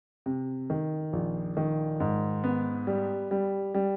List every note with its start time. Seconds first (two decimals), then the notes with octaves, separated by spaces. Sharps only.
0.26 C3
0.70 D#3
1.13 A#1
1.57 D#3
2.00 G#2
2.44 B3
2.87 G3
3.31 G3
3.75 G3